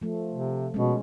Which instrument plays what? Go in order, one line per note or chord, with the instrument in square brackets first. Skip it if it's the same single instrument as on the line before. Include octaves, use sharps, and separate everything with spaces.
[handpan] F3 A3
[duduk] C3
[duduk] B2 [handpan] G#3 C#4